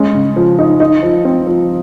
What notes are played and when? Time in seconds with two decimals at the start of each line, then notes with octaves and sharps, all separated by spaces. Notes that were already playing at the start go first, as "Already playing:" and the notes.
Already playing: G#3 C#4
0.14 C#3
0.36 F3
0.59 D#4
0.80 D#4
1.03 F3
1.25 C4
1.47 F3